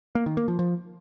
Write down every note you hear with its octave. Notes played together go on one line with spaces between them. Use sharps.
A#3
D#3
A#3
F3
F3